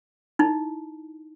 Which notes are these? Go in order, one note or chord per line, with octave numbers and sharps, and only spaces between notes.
D#4 E4